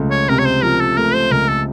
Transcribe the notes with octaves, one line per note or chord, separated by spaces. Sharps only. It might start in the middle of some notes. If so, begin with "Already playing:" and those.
Already playing: C#2 F3 A3
C#5
C3 A#4
C#5
C5
F3 A#4
A4
A3 A#4
C5
C#2 A#4
A4